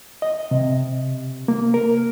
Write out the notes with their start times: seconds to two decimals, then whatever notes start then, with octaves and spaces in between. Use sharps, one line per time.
0.22 D#5
0.51 C3
1.48 A#3
1.74 A#4